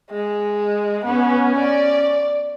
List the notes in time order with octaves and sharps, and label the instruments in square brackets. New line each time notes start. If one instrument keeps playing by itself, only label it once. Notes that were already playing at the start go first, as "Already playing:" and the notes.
[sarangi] G#3
[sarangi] B3 [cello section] C#4
[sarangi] D5